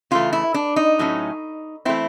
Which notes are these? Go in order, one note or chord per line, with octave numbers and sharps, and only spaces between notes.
C#3 E3 A3 F4
E4
D4
D#4
A2 F#3 A3 C#4
E3 A3 C4 E4